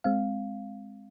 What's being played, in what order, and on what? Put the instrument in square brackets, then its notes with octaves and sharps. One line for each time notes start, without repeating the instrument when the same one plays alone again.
[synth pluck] G#3 C4 F5